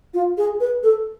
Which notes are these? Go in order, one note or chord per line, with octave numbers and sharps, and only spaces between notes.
F4
G#4
B4
A4